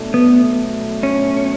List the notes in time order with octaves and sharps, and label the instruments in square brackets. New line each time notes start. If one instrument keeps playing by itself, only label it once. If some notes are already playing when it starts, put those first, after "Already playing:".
Already playing: [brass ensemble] B2 F#3 A3 D4
[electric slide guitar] B3
C#4